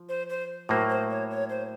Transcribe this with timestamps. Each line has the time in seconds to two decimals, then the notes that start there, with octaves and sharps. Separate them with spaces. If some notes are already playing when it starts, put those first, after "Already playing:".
Already playing: F3
0.09 C5
0.29 C5
0.69 A2 F#3 A#3 C5
0.89 C5
1.10 C#5
1.30 C#5
1.49 C5